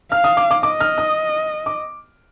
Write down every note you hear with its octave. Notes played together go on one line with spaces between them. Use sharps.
F5 F6
D#6
D6
D6
D#5 D6
F6
D#6
D6